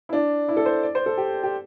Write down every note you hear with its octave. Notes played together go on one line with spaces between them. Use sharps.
E4
D4
E4
A4
C5
D5
C5
A4
G4
G4